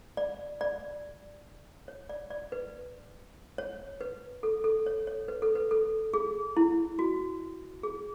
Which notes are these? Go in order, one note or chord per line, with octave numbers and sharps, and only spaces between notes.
D5
D5
C#5
D5
D5
B4
C#5
B4
A4
A4
C#5
C#5
B4
A4
B4
A4
G#4
E4
F#4
G#4